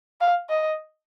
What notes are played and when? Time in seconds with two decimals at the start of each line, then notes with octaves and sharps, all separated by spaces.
0.21 F5
0.49 D#5